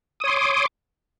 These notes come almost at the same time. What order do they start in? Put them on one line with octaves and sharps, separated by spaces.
D#6 C#5 C6 D6